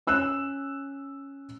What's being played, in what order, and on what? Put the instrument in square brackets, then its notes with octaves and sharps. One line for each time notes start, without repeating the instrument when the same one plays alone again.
[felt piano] C#4 E6 F#6 E7